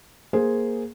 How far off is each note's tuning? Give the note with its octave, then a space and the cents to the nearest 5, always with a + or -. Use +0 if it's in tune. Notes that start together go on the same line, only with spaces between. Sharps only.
A#3 +0 G#4 +0 C5 +0